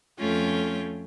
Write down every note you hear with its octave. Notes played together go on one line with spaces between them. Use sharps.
F2 A3 C#4 F4 G5